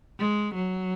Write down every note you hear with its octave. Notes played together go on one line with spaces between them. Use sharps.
G#3
F#3